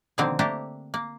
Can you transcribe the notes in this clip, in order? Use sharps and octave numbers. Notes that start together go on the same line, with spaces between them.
B2 D3 D#3 F3 A#3 C4
A3 A#3 D4 G4 A4 A#4
A#3